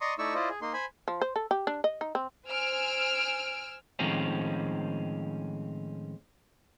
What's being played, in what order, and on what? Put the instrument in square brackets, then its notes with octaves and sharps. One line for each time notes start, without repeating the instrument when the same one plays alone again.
[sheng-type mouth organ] D5 D#5 A#5 C6 C#6 D#6
A3 D#4 E4 D5 C#6 E6
E4 F4 C5 D5 D#5
G#4
A#3 D#4 C6
C5 G#5 B5
[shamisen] F3
C5
A4
G4
D4
D#5
D#4
C4
[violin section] C5 G#5 E6 F6 D7
[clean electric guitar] A2 D#3 F3 G#3 C4 C#4